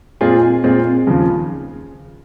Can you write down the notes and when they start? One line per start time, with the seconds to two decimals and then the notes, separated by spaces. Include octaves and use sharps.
0.21 A#2 G#3 C4 F4 G#4
0.64 A#2 G#3 C4 F4 G#4
1.07 D#2 C#3 F3